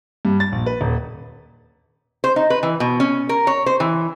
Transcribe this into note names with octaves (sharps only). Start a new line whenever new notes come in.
G2
A6
A#1
B4
D#1
C5
D#4
B4
E3
B2
C#4
A#4
C#5
C5
E3